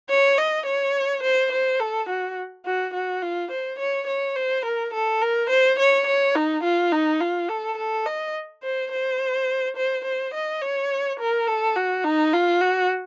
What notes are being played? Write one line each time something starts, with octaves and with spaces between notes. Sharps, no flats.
C#5
D#5
C#5
C5
C5
A4
F#4
F#4
F#4
F4
C5
C#5
C#5
C5
A#4
A4
A#4
C5
C#5
C#5
D#4
F4
D#4
F4
A4
A4
D#5
C5
C5
C5
C5
D#5
C#5
A#4
A4
F#4
D#4
F4
F#4